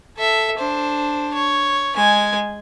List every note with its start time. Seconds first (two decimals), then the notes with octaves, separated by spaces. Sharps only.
0.16 A4 E5
0.58 D4 C5
1.34 C#5
1.96 G#3 G#5